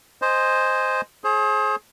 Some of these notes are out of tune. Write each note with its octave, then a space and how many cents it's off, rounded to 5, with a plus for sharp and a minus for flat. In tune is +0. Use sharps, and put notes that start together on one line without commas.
C5 +0 D#5 -5 G#5 -5
G#4 +30 C5 +40